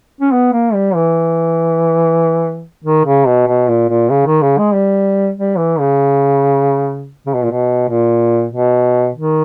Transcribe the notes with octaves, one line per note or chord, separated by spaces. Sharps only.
C#4
B3
A#3
G3
E3
D#3
C#3
B2
B2
A#2
A#2
C#3
D#3
C#3
G#3
G3
G3
E3
C#3
C#3
B2
A#2
B2
A#2
B2
D#3